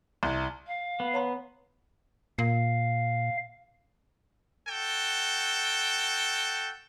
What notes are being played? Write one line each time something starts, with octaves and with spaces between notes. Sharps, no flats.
C2
F5
B3
C#5 A#5 C6
A#2 F5
F#4 A4 G5